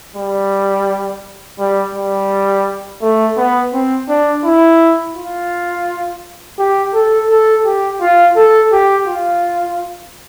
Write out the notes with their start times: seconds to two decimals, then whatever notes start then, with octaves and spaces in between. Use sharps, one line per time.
0.16 G3
1.59 G3
1.95 G3
3.02 A3
3.37 B3
3.74 C4
4.09 D4
4.44 E4
5.15 F4
6.59 G4
6.94 A4
7.30 A4
7.65 G4
8.01 F4
8.36 A4
8.72 G4
9.07 F4